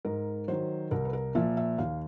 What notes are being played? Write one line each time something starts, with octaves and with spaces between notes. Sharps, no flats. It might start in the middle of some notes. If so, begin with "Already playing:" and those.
G#2 A#4
D#3 F#3 C5
C2 A#4
B4
A#4
A#2 F3 E5
E5
D#2 F5